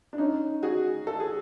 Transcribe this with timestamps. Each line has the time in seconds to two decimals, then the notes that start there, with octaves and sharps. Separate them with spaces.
0.13 D4
0.18 C#4 D#4
0.63 F#4 G#4
1.07 A4
1.20 G#4